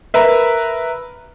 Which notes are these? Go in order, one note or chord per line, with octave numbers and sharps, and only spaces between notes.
A#4 B4 E5